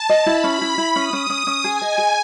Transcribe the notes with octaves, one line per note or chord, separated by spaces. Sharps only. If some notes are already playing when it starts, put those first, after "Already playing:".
Already playing: A5
D#5
E4 B5
C#4
E4
E4
C#4 D#6
C#4
C#4 D#6
C#4
G#4 G#5
D#5
G#4